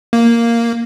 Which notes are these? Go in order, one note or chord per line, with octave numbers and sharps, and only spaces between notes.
A#3